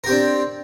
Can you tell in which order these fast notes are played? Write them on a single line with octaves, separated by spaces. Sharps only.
A#4 G4 C4 D4